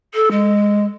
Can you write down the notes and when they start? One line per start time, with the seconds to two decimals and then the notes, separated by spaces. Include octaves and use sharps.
0.14 A4
0.31 G#3